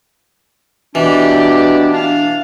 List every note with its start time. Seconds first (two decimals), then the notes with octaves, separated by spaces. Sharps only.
0.95 B2 E3 D4 G4 D5
1.93 D4 F5